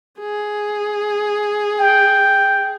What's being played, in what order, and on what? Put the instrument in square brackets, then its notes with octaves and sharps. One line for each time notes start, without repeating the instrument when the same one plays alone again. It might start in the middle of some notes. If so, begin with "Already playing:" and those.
[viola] G#4
[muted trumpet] G5